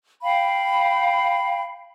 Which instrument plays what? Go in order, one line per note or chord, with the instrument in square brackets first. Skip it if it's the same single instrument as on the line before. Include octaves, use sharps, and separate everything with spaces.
[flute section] F5 G5 B5